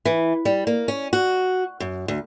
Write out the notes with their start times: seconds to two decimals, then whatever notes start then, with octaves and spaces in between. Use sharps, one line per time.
0.05 E3
0.45 G3
0.67 A#3
0.88 C#4
1.13 F#4
1.80 F#2
2.08 D2